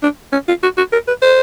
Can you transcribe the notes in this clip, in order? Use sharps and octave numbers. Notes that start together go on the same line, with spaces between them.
D4
C#4
F4
F#4
F#4
A#4
B4
C5